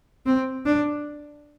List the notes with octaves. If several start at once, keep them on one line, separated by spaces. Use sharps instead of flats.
C4
D4